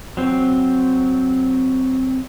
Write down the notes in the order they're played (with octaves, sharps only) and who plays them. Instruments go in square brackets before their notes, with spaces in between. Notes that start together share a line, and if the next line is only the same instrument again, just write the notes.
[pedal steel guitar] F#3 C4